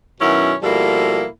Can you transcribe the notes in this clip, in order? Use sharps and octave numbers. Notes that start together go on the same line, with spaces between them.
F#2 B2 D#3 C#4 E4
B2 F3 G3 A#3 E4 A4